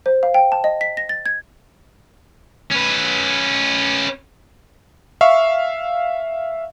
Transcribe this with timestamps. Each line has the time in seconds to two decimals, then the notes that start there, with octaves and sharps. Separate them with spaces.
0.06 C5
0.23 F5
0.34 G5
0.52 A5
0.64 D#5
0.81 B6
0.97 A#6
1.09 A6
1.26 G#6
2.72 C#4 B4
5.21 E5 F5 C#6